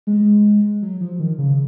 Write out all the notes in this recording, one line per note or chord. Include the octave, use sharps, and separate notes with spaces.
G#3
F#3
F3
D#3
C#3